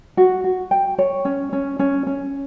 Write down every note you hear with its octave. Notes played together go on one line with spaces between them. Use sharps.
F#4
F#4
G5
C#5
C#4
C#4
C#4
C#4